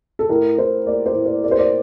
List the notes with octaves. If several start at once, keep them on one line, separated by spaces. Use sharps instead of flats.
A4
A2 A#4
A2 C5
A#3 D5
C5
A2
C5
A#3 D5
C5
D5